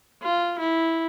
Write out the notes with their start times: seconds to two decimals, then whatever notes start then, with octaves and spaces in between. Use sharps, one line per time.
0.23 F4
0.59 E4